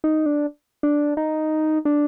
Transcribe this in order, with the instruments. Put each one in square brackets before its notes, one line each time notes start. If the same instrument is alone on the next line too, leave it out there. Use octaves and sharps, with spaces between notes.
[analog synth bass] D#4
D4
D4
D#4
D4